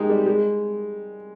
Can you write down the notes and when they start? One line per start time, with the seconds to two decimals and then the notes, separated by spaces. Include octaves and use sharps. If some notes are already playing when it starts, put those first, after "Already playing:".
Already playing: G#3 D#4 G4
0.09 G3
0.26 G#3